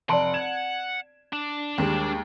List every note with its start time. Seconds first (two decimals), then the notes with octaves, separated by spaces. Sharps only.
0.09 F1 D5 F#5 A5 C6 D7
0.34 G#6 E7
1.33 D4
1.78 D#2 G3 G#3